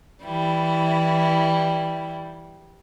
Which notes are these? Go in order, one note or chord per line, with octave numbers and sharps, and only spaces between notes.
E3 G3 E4